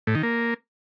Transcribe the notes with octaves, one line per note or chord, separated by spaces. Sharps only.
A2
D#3
A#3